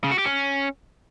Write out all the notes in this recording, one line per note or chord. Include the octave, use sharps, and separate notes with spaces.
C#3
F#4
G4
C#4